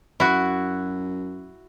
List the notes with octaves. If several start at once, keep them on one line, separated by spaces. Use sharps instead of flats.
F#2 E4 F#4